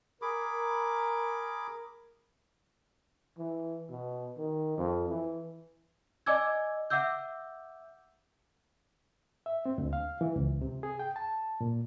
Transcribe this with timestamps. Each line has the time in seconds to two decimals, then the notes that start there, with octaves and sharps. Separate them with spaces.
0.22 G#4 A#4 B5 D6
3.38 E3
3.90 B2
4.38 D#3
4.78 F2
5.09 E3
6.26 D5 D#5 G#5 D6 E6 G#6
6.90 E5 F#5 D6 E6 G6
9.46 E5
9.66 C4
9.78 D2
9.93 F5
10.21 E3
10.36 C#2
10.62 C3
10.83 G#4
10.99 G5
11.16 A5
11.61 A#2